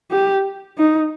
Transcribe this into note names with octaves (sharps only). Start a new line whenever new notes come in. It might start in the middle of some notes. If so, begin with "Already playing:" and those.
G4
D#4